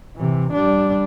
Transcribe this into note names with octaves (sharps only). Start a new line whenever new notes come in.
C3 E3
G3 D4